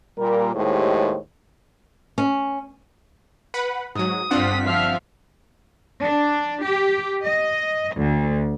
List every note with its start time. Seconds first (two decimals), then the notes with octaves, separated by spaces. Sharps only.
0.18 A#2 G3 A#4
0.54 D#2 A2 G#3 G4 C5 C#5
2.18 C#4
3.54 B4 F#5 B5
3.95 G#2 F#3 D#6
4.31 G1 G2 C4 D4 F4 F#5 B6
4.66 F3 E5 F5 F6
6.03 D4
6.65 G4
7.22 D#5
7.96 D2